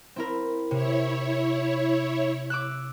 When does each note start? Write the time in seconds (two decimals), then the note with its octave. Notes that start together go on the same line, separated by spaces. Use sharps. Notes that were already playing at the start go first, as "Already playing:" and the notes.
0.16 C4 E4 A#4
0.71 C3 E4 C#5
2.50 D6 E6 F#6